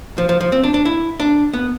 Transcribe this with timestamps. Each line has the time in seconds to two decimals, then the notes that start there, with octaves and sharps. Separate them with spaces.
0.18 F3
0.29 F3
0.41 F3
0.52 C4
0.64 D4
0.74 D4
0.85 E4
1.20 D4
1.54 B3